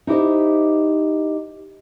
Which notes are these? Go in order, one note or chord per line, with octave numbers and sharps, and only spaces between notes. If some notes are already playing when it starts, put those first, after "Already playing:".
D#4 E4 G4 C5 D#5